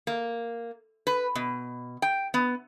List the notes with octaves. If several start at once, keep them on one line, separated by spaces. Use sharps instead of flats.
A#3
B4
B2
G5
B3